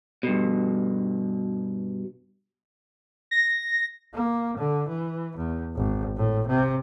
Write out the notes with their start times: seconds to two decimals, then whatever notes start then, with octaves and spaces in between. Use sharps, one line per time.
0.23 G2 B2
3.31 A#6
4.14 A#3
4.58 D3
4.88 E3
5.37 E2
5.76 G#1
6.17 A2
6.47 C3